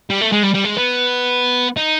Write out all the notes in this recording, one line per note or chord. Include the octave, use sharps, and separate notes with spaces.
G3
A3
G#3
G3
G3
G#3
B3
D#4